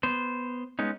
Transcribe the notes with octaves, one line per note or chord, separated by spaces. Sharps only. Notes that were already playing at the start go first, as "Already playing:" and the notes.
B3 C5
G#3 B3 C#4 D#4